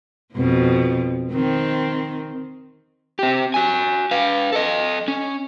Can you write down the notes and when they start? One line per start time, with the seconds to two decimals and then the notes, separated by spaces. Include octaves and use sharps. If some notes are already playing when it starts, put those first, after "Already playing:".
0.35 F2 B2 F3
1.31 D#3 C4
3.19 C4 G4
3.54 F#4 G#5
4.11 B4 F5
4.52 A4 D#5
5.08 C#4